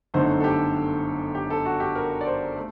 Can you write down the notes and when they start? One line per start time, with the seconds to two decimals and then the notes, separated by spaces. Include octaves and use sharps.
0.14 G1 F#2 D3 A3 D#4 C5
0.40 A4
0.44 G4
1.35 G4
1.50 A4
1.66 F#4
1.80 G4
1.95 A#4
2.21 D5
2.26 C5
2.56 A3